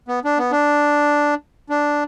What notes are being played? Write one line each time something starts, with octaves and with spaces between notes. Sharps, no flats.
B3
D4
B3
D4
D4